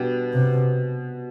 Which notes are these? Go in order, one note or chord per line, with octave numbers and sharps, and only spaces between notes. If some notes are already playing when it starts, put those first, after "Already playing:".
Already playing: B2 G3 D4
C3